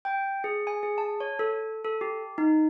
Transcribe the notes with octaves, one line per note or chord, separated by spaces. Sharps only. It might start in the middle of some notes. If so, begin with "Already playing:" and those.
G5
G#4
G#5
G#4
A5
C#5
A4
A4
G4
D#4